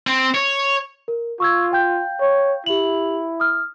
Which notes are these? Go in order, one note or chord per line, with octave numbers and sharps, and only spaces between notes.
C4
C#5
A#4
F4 C#6 E6 G#6
F5 G5 G6
C#5
E4 G4 F7 F#7
D#6 F6